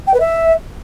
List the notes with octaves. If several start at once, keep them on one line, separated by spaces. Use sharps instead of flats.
G5
B4
E5